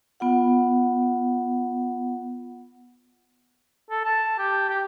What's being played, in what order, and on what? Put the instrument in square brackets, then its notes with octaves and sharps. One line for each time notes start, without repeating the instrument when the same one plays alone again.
[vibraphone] B3 F4 F#5
[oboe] A4
A5
G4
G4